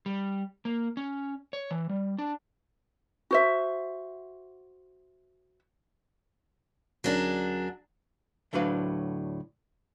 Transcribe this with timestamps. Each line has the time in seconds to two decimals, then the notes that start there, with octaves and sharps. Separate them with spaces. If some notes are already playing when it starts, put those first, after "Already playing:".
0.06 G3
0.65 A#3
0.97 C#4
1.53 C#5
1.71 E3
1.89 G3
2.18 D4
3.31 F#4 C5 E5
7.04 D2 F#3 C#4 D4 G#4 A#4
8.53 D2 A2 F#3 D4 B4 F5